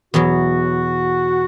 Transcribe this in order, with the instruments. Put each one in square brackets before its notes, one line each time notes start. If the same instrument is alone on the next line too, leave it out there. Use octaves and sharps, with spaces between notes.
[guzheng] E2 B2 F#3 [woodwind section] F#4